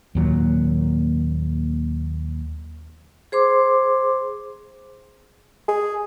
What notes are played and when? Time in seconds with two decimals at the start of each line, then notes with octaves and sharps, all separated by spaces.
0.15 D#2 A#2 F#3
3.32 G#4 C5 C6 D6
5.68 G#4